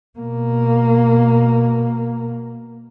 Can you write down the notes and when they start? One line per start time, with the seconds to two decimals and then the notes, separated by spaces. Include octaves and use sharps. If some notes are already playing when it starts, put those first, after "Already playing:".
0.19 B2 A#3